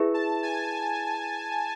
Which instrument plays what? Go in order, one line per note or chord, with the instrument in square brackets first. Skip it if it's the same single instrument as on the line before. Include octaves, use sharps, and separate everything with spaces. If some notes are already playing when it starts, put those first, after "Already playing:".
Already playing: [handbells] E4 G#4 B4 E5
[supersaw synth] A5
G#5